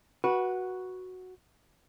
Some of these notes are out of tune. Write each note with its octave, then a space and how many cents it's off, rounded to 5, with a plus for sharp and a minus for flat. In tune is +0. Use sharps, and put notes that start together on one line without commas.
F#4 +0 B4 -20